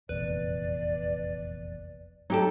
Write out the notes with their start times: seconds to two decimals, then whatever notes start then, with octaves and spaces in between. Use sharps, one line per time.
0.09 F1 A#1 E2 B4 D5
2.30 F#3 D#4 G4 A4